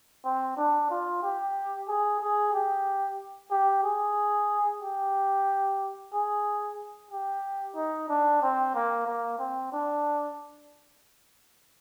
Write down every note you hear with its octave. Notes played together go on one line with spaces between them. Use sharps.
C4
D4
F4
G4
G#4
G#4
G4
G4
G#4
G4
G#4
G4
D#4
D4
C4
A#3
A#3
C4
D4